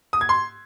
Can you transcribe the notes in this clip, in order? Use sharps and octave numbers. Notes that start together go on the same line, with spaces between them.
D#6
G#6
C6